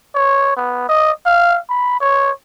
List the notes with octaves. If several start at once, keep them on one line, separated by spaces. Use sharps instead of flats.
C#5
B3
D#5
F5
B5
C#5